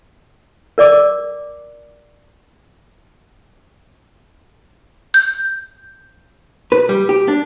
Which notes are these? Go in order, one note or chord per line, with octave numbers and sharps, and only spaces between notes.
A#4 D5 D6
G6
B4
G3
G4
D4